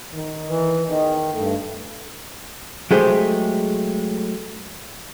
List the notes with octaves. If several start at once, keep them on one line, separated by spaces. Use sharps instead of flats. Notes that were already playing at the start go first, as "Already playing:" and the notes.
D#3
E3
E2 D#3 D#4 D#5
G2 A3
F#3 G#3 A3 G4 G#4 C5